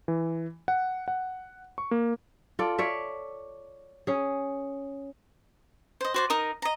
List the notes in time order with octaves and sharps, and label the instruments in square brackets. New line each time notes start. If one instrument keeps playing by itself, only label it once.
[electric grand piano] E3
F#5
F#5
C#6
A#3
[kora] F4 A4 D5
C#5 D5 E5
C#4 G#4
[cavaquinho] C5 D#5
F#4 C5 D5
D#4 A#4 D#6
D#5 A#5